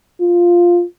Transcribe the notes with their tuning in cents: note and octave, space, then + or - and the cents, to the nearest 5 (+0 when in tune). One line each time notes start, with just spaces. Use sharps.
F4 +0